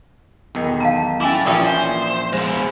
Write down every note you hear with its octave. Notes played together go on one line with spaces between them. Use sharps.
B1 E2 D#3
F5 A5 A#5
C#4 E4 A4 G#5 D6
A#1 A#2 E3 C#4 D5 D#6
C5
G#3 B3 C5